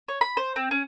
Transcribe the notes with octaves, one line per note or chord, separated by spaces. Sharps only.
C#5
B5
C5
C4
C#4